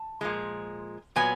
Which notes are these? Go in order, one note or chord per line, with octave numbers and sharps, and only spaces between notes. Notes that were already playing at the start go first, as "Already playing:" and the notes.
Already playing: A5
A#2 F3 G#3
A#2 F#3 B3 G#5